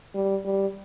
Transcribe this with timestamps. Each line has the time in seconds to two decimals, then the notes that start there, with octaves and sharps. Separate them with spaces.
0.15 G3
0.45 G3